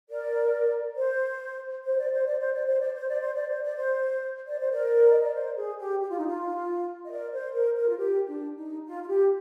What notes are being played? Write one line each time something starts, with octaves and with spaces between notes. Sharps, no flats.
A#4 D5
C5
C5
D5
C5
D5
C5
D5
C5
D5
C5
D5
C5
D5
C5
D5
C5
D5
C5
A#4 D5
D#5
D5
C5
G#4
G4
G4
F4
D#4
F4
D#5
A#4 D5
C5
A#4
A#4
F4
G4
D4
D#4
F4
F4
G4